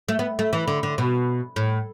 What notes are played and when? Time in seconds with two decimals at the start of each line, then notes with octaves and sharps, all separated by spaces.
0.09 A3
0.19 B3
0.39 A3
0.53 E3
0.68 D3
0.83 D3
0.98 B2
1.56 A2